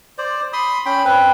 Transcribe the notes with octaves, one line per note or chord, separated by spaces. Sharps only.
C5 D5
B5 C6 D#6
C#4 G5 B5
C4 B4